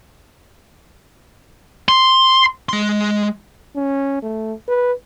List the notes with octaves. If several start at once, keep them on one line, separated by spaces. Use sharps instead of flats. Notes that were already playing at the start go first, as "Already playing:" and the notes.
C6
G#3 C6
C#4
A3
B4